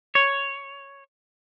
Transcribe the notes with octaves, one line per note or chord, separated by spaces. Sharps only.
C#5